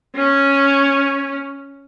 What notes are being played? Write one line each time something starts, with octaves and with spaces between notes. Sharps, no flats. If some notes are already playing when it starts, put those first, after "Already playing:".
C#4